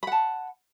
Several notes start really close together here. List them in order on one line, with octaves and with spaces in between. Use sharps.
B5 F#5 A5